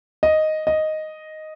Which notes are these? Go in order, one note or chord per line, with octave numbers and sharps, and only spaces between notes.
D#5
D#5